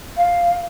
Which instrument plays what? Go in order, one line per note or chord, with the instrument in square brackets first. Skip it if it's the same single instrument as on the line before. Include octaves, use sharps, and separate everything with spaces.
[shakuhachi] F5